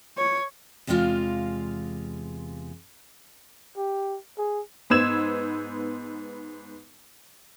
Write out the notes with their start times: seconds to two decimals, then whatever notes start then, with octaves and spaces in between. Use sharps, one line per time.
0.18 C#5
0.87 E2 C3 G#3 A#3 F4 F5
3.77 G4
4.38 G#4
4.90 G#2 B3 C5 E6 G#6 E7